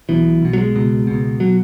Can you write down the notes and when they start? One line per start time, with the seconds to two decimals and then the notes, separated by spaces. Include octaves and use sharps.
0.09 B1 B2 E3
0.41 B1 B2
0.53 F#3
0.58 G#3
0.75 C#2 B2
1.07 C#2 B2
1.40 B2 F#3